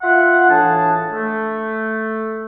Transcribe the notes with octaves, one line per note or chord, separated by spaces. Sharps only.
F4 E5 F#5
A2 E3 D4 G#4 A5
A3